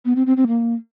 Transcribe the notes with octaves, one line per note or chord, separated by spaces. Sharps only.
B3
C4
C4
C4
A#3